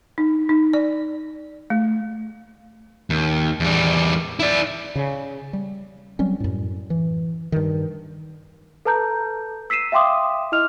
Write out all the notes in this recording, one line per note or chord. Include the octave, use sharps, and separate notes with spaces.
D#4
D#4
D5
A3
D#2
E2 G3
E4 D5
C#3
G3
F#3 G3 C4 C#4
F#2 A2
E3
G2 D#3
A4 B4 A5 A#5 G6
E6 B6 C7 D#7 E7
E5 F5 G5 C6 D6 D#6
E4 D#5 F6 F7